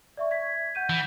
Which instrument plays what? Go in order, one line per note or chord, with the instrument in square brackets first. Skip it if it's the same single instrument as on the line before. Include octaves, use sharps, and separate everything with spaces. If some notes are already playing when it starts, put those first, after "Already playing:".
[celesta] D5 E5 C#6
G#6 B6
F#5 G6 D#7
[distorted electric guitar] E3